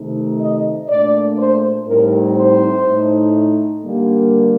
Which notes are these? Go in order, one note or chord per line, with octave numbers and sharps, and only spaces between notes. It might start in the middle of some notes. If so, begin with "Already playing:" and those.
Already playing: C3 D#3 A3 D#4
D#5
A#2 A3 D4 D5
C5
A2 G3 C4 D#4 A#4
C5
A2 A3 D#4
D3 G3 A#3